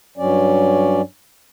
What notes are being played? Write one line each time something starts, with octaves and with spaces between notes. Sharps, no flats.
G2 F#3 C#4 D5